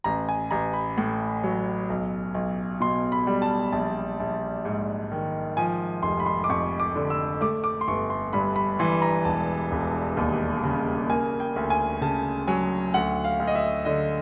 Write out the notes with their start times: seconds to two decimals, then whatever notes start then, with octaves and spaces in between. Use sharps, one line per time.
0.04 A1 A#5
0.29 G#5
0.51 A1 A#5
0.73 B5
0.98 A2
1.44 F#3
1.90 B1
2.34 B1
2.80 B2 C6
3.12 B5
3.27 G3
3.42 A5
3.72 A#1 A5
4.20 A#1
4.65 G#2
5.11 D#3
5.57 F3 G#5
6.03 F1 C6
6.20 B5
6.26 C6
6.44 D6
6.49 F2 C#6
6.80 D6
6.96 D3
7.10 E6
7.41 A3 D6
7.64 D6
7.81 C6
7.88 G1 C#6
8.10 C6
8.33 G2 B5
8.56 B5
8.79 E3 C6
9.02 A#5
9.25 E1 A5
9.72 E1
10.17 D#2
10.63 C#3
11.09 A#3 G#5
11.40 G5
11.56 D2
11.70 G#5
12.01 C#3 A5
12.47 F#3 G#5
12.94 D2 F#5
13.24 F5
13.39 D2
13.47 D#5
13.55 E5
13.85 D3 D#5